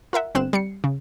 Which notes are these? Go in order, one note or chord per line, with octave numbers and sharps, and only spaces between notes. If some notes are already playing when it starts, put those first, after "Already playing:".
F4 A#4 E5 F#5
G1 C4 F#6 E7
G3 C7 C#7
C#3